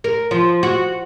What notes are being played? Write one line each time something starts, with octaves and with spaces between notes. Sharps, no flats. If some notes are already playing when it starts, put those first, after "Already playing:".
A#4
F3
F#4